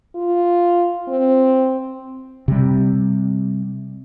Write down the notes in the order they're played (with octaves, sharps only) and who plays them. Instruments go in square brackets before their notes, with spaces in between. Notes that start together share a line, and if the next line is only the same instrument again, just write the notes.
[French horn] F4
C4
[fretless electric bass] C3 G3